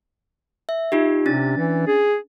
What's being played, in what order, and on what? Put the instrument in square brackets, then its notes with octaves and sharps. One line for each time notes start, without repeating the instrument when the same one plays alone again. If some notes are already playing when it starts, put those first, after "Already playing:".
[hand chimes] E5
D#4 F4 G4
[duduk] C3 [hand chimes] C#4 D4 A6
[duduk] E3
G#4